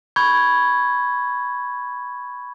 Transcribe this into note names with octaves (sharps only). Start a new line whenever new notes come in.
B5 C#6 G6 G#6